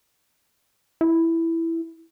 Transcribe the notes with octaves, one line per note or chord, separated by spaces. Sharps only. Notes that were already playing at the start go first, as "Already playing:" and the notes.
E4